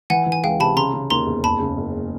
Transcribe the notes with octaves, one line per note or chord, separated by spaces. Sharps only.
E3 F#5 G#5
E3
G#5
C#2 F5 G5
C3 A5 B5
C#3 A#5 C6
C#3
D#2 A#5 C6
E1
F#1 A5 B5
C#3
F#1